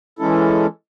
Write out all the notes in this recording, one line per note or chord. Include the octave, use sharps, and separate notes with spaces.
E3 G#3 C#4 E4 A4